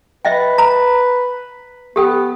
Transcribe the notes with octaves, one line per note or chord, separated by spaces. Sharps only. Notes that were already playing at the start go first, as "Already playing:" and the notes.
B4 D#5 E5 G5
A#5
B3 G4 A4 G5